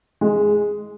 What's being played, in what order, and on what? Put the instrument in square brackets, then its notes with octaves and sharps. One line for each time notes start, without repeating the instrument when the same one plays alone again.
[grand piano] G#3